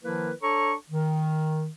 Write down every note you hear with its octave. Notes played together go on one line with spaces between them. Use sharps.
D#3 F3 A#3 E4 A#4 B4
D4 A4 C#5 A#5 C#6
D#3